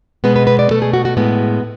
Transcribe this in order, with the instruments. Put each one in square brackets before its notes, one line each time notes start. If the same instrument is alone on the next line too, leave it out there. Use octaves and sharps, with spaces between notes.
[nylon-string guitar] B2 G#3 B3 B4
B4
B4
D5
B2 A3 A4
G#4
F#4
F#4
A2 G#3 B3